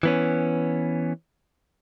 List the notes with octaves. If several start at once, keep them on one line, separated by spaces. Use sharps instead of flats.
E3 B3 C#4